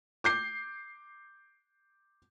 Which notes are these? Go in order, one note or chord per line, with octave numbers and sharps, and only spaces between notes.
D6 G6 C7